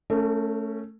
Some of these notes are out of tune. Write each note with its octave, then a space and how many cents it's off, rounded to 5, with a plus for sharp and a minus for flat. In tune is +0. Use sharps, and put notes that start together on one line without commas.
A3 +0 C#4 +0 A#4 -40